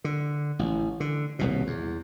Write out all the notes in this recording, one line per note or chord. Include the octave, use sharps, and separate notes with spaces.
D3
A1
D3
D#1 C2 B2
E2